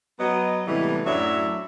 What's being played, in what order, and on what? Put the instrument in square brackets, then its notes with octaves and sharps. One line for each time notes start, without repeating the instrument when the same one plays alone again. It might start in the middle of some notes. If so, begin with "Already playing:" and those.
[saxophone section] F#3 B3 D#5
A2 C3 E3 G3 G#3 B3
F#2 A2 F#3 D4 E5